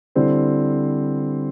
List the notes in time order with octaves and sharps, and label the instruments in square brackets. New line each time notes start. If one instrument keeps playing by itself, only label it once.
[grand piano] D3 G3 C4 E4 C5